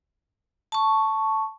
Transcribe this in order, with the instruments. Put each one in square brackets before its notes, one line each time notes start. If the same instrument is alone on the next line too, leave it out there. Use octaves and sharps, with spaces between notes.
[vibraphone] A5 C#6